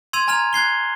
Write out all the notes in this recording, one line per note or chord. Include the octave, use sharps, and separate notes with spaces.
C6 E6 G#6 D#7 F7
G#5 A#5 F6 G#6 F7
F#6 G#6 C7 G7